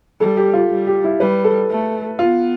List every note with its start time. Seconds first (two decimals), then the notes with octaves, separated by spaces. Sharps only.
0.20 G3 A4
0.37 G4
0.54 F4
0.70 G3
0.87 G4
1.04 E4
1.20 G3 B4
1.44 A4
1.70 A3
2.19 B3 F4